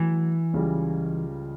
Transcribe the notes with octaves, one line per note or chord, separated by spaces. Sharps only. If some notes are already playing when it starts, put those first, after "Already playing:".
Already playing: E3 F#3 A3
C#2 C#3 G3